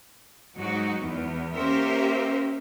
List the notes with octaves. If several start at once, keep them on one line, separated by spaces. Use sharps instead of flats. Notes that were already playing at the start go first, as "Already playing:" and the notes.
G#2 F#3 G#3 D#4 F#4
E2
A#3 C#4 G4 A#4 C5 E5